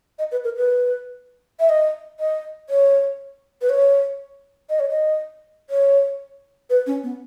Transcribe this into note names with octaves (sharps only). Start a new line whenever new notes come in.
D#5
B4
A#4
B4
E5
D#5
D#5
C#5
B4
C#5
D#5
C#5
D#5
C#5
B4
C#4
B3